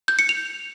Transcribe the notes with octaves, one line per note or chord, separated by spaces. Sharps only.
G6
C#7
F7